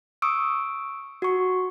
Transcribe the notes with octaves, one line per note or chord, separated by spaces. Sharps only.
C#6 D#6 E6 D7
F#4 C#6